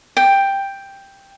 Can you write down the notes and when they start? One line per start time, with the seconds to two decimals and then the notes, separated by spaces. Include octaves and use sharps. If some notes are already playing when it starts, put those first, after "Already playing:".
0.17 G5